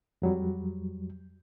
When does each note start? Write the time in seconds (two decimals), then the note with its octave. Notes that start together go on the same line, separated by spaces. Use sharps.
0.22 F2 F#3 G3